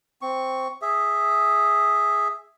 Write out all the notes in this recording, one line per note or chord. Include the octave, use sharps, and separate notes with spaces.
C4 C#6
G#4 E5